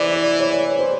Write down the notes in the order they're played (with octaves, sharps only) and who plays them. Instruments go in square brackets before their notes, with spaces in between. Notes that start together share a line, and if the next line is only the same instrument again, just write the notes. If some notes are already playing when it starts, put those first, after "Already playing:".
Already playing: [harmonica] E3 [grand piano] C5 D5
[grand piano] D5
C#5
C5